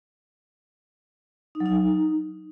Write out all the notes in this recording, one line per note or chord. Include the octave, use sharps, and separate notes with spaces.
D#4
F#3
D#4